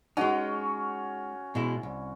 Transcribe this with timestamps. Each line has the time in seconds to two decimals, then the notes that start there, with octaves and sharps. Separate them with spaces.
0.17 G#3 C#4 D#4 F#4
1.55 B2 G#3 E4
1.83 C2